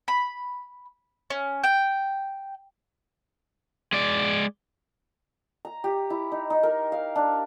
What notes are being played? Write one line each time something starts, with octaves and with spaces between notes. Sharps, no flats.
B5
C#4
G5
G#3 D5
A#5
G4
E4
D#4
D#4
A#4
F5
D4